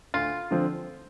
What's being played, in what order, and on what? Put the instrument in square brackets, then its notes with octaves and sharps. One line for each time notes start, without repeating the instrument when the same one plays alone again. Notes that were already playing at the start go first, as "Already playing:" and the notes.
[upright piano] D2 [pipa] F4
[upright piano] D3 F3 C4